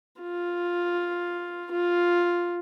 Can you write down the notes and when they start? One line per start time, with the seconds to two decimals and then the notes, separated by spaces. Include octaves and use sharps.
0.22 F4
1.72 F4